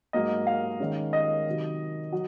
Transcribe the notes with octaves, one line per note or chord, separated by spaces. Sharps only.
G#2 F#3 A#3 D#5
F5
D#3 G#3 C#4
D#5
C3 D#3 F#3
F#3